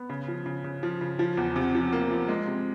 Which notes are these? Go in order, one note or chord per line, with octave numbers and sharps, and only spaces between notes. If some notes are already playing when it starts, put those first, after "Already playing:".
Already playing: B3
C#3
F3
C#3
C#3
F3
C#3
F3
E2
C3
F3
A#3
F3
G#3
C3